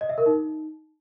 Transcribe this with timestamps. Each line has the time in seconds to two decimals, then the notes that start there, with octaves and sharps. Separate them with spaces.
0.01 D#5
0.09 E5
0.18 A#4
0.26 D#4